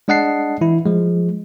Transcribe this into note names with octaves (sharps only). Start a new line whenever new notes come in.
G#3 D4 D#5 F#5 A5 C7
E3 E4
F3 G#3